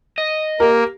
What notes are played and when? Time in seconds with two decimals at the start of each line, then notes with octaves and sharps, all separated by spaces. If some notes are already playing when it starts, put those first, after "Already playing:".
0.18 D#5
0.60 A#3 G4 A#4